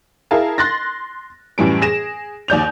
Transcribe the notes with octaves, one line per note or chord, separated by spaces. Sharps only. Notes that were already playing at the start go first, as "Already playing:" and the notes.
E4 G#4 A#4 F5 A5
C6 F#6 A6 A#6
F#2 A2 E3 G3 D7
G#4 A#6 E7
D#2 D5 G6 F7